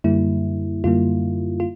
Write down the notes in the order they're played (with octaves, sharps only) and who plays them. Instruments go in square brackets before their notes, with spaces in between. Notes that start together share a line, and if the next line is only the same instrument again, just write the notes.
[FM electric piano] F#2 D3 G3 A#3 E4
F#2 D3 G3 A#3 F4
F4